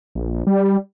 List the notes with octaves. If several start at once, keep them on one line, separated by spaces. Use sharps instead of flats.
A#1
G3